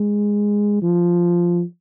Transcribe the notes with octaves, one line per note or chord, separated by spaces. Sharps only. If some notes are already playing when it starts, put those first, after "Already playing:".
Already playing: G#3
F3